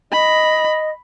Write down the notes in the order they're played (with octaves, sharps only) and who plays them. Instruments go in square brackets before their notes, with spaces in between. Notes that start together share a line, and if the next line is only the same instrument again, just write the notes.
[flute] D#5 [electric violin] B5